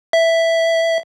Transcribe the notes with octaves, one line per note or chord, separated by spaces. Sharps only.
E5